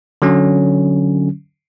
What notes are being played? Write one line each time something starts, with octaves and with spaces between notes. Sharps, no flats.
D3 F#3 C#4